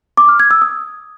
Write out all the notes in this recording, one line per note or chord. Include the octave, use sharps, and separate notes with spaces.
D6
F6
G#6
E6
D#6